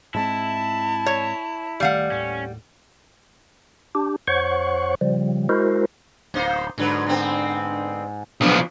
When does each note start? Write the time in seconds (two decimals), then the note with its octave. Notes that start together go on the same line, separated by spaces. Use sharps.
0.14 G#2 G#3 C4 E4 A5
1.06 C#5
1.80 D1 D#3 G3 A3 F5 F#5
2.11 D#2 A2 C#4
3.95 D4 G4
4.28 F2 C5 C#5 F#5 C#6
5.01 C#3 F3 G3
5.49 G#3 E4 F#4 A#4 C5
6.34 D1 A#3 D#4 C5
6.78 G#2 D3 F#3 B4
7.07 D3 B3 C4
8.41 B1 E2 B2 F3 B3 D4